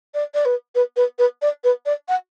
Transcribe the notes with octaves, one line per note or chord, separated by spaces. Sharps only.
D5
D5
B4
B4
B4
B4
D5
B4
D5
F#5